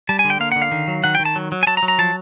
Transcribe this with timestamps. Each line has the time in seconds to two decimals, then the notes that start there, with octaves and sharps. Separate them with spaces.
0.09 G3 A5
0.19 G#5
0.24 D3
0.30 G5
0.40 A#3 F5
0.52 D3 F#5
0.62 F5
0.71 D#3
0.88 F#3
1.04 D#3 F#5
1.15 D#3 G5
1.25 A5
1.36 F#3
1.52 F#3
1.63 G#5
1.67 F#3 A5
1.77 A#5
1.83 F#3
1.88 A#5
1.98 F3 A5